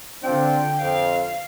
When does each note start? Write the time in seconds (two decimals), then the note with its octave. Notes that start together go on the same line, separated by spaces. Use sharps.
0.23 D3 C4 D4 F4 G5
0.81 F2 F5